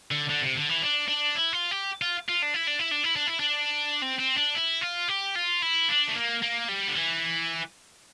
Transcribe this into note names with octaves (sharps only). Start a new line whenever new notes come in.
D3
D3
C3
D3
E3
D4
D4
E4
F4
G4
F4
F4
D4
E4
D4
E4
D4
E4
D4
E4
D4
C4
C4
D4
E4
F4
G4
F4
E4
D4
A3
A#3
A#3
G3
D3
E3